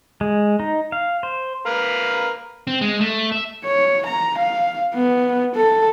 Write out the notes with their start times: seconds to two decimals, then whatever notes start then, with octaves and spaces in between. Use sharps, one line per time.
0.21 G#3
0.60 D#4
0.92 F5
1.23 C5
1.66 A#4 B4 F5
2.67 C4
2.81 G#3
3.01 A3
3.32 E5
3.65 C#5
4.06 A#5
4.38 F5
4.94 B3
5.55 A4